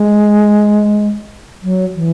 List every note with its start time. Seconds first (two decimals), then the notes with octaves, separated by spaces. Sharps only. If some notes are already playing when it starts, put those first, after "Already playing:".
Already playing: G#3
1.63 F#3
1.95 E3